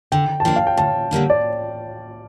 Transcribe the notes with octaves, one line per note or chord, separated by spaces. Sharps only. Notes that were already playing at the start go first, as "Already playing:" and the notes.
D3 G5
A5
F3 A#3 D4 G5
F5
G5
D2 A5
D3 G3 A#3 D4
D5